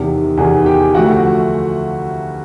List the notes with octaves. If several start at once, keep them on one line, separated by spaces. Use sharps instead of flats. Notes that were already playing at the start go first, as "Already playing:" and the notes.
Already playing: E2 C3 D#3
E2 C3 D#3 G#4 G#5
G4 G5
D2 D3 F3 A3 F#4 F#5